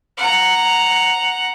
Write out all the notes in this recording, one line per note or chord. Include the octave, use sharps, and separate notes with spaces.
F#5 A#5